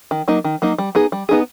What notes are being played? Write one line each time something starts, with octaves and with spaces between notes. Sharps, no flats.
D#3
F#3 A#3 D#4
D#3
F#3 A#3 D#4
G3
B3 D#4 G#4
G3
B3 D#4 G#4